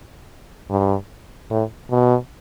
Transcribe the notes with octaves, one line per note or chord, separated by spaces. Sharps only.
G2
A2
B2